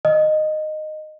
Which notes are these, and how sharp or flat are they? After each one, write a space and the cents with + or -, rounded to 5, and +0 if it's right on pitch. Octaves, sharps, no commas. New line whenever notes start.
D#5 -15